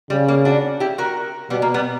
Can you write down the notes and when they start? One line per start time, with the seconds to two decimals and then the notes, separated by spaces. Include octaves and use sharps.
0.10 C#3 G3
0.28 A#3
0.45 D4 F#4
0.80 E4 G4
0.98 F#4 A#4
1.50 B2 G3 B3
1.62 A#3
1.74 G3 B3